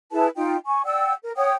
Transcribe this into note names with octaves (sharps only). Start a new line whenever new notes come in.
E4 G#4 B4 A5
D#4 F4 G5
G#5 C#6
D5 F#5 G5 E6
A#4
C#5 F#5 G5 D#6